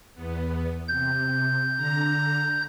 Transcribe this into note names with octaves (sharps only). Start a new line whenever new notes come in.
E2 B3
C3 G6
D3 A#5